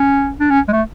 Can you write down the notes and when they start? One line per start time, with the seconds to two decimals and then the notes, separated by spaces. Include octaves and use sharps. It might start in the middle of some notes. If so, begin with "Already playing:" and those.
Already playing: C#4
0.40 D4
0.50 C#4
0.68 G#3
0.72 A3